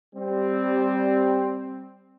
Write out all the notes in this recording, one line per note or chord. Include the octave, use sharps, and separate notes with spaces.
G3 C4